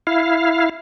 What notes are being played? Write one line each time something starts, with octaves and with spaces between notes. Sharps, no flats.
E4 F5